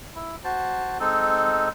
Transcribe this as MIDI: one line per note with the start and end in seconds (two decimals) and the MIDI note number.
0.15 0.36 64
0.44 0.98 66
0.44 0.98 72
0.44 0.98 81
1.00 1.69 56
1.00 1.69 60
1.00 1.69 63
1.00 1.69 69